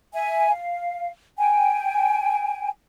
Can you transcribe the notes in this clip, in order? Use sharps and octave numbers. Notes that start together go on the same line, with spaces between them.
E5 G#5
F5
G5 G#5